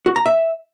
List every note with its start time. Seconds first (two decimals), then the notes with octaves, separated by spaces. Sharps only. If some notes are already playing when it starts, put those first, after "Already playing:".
0.06 F#4
0.16 A#5
0.26 E5